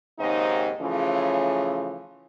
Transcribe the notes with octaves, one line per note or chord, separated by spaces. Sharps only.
D#2 G#2 C#3 C4 D#4 D#5
C#3 E3 F3 A3 C#4